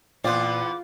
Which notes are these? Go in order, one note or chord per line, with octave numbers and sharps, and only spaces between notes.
E2 A#2 B3 C4 F4 D5 D6 F#6